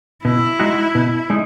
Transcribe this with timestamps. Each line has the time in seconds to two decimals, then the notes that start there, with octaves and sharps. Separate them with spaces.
0.25 B2 E4
0.60 G#3 D#4 F#4
0.95 B2
1.30 G#3 D#4